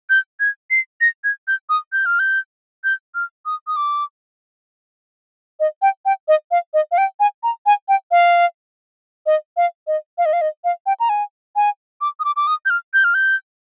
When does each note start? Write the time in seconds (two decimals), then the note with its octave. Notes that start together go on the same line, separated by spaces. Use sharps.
0.10 G6
0.40 G#6
0.71 C7
1.01 A#6
1.24 G#6
1.48 G6
1.69 D#6
1.93 G6
2.06 F6
2.19 G6
2.84 G6
3.15 F6
3.46 D#6
3.67 D#6
3.76 D6
5.60 D#5
5.82 G5
6.05 G5
6.28 D#5
6.51 F5
6.74 D#5
6.92 F5
6.98 G5
7.20 G#5
7.43 A#5
7.66 G#5
7.88 G5
8.11 F5
9.26 D#5
9.57 F5
9.87 D#5
10.18 F5
10.26 D#5
10.33 F5
10.41 D#5
10.64 F5
10.86 G5
11.00 A#5
11.09 G#5
11.56 G#5
12.01 D6
12.20 D#6
12.25 D6
12.36 D6
12.47 D#6
12.66 G6
12.70 F6
12.94 G6
13.04 F6
13.15 G6